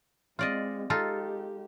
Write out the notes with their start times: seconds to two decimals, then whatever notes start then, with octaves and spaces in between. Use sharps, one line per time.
0.39 G#3 C4 F4 D5 D#5
0.90 G#3 D#4 F4 G4 A4